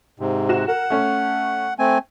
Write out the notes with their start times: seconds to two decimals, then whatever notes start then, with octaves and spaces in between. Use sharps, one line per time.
0.20 G#2 C3
0.49 F#4 E7
0.68 A#4 F#5
0.90 A3 C#4
1.79 A3 C4 G#5